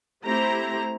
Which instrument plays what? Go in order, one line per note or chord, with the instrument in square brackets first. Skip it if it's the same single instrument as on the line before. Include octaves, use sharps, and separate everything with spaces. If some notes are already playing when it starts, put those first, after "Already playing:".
[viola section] A3 C4 E4 G4 C5 A#5